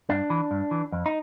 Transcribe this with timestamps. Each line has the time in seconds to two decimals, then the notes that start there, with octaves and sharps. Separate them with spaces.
0.10 G2 D4
0.30 E3
0.51 G2
0.71 E3
0.92 F2
1.06 D#4